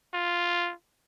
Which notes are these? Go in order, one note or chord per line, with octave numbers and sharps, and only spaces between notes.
F4